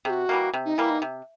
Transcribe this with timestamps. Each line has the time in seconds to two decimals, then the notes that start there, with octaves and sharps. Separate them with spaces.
0.05 C3 G#4
0.10 F#4
0.29 E3 G3 A#3
0.53 C3
0.65 D#4
0.78 E3 G3 A#3 E4
0.90 D#4
1.02 C3